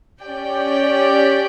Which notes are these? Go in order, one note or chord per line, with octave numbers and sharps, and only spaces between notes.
C#4 G4 D5 G5